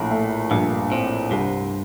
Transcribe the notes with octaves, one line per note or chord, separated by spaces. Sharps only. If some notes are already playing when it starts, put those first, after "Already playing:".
Already playing: A#1 A2
A3
A#1 G2
A2 C4
C2 G2